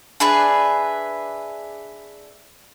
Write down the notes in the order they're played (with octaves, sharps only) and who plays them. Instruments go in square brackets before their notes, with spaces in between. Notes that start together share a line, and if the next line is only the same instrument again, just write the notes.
[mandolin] D4 G#4 B4 E5